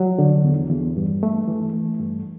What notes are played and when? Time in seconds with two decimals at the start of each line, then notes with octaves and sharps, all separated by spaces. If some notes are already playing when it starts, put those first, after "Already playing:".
Already playing: F#3
0.19 D3
0.44 E2
0.70 E2
0.97 G2
1.23 A3
1.48 E3
1.73 A3
2.00 G2